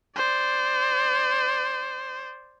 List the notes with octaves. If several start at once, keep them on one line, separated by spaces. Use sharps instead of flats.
C5 D5